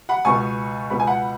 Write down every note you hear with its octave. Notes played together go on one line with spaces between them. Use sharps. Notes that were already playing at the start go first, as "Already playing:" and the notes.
F#5 B5
C#2 B2 B3 G#5 C#6
C#2 B2 B3 B5
G#5
F#5 B5